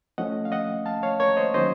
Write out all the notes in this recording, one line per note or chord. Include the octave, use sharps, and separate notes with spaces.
F3 A3 C#4 D#5 F#5
F5
D#5 F#5
F5 A5
C#5 F5
A#4 C#5
C5 D#5
D#3 F#3 A#3 C#4 C5 D#5